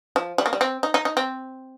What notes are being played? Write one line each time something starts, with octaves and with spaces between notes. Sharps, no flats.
F3
G3
A#3
G3
C4
D#4
D#4
D#4
C4